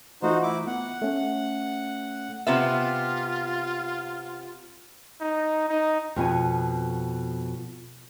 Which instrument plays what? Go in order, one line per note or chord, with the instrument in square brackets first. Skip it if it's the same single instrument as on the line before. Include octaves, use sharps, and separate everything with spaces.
[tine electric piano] E3 A3 F4 [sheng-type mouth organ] D#4 F#4 C5
[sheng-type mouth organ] E4 D6
[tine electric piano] B3 [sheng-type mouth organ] F#5
[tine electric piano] A3 C#4
[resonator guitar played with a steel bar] C3 B3 E5 [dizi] F4
[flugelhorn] D#4
D#4
[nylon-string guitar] F2 B2 B3 G#5